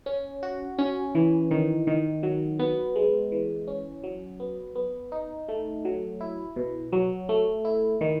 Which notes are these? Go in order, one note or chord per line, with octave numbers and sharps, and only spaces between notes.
C#4
F#4
C#4
E3
D#3
D#3
F#3
B3
G#3
E3
C#4
F#3
B3
B3
D#4
A3
F#3
E4
B2
F#3
A3
E4
D#3